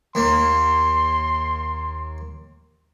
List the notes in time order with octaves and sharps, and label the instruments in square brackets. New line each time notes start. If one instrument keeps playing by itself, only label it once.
[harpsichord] D#2 A#3 [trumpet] C6